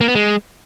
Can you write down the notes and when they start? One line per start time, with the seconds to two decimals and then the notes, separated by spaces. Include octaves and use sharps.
0.01 A#3
0.08 B3
0.15 G#3